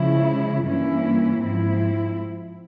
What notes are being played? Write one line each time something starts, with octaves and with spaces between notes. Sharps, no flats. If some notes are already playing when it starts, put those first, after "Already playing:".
Already playing: C#3 F3 G#3 E4
G2 E3 A#3 C#4 E4
G#2 F3 C4 E4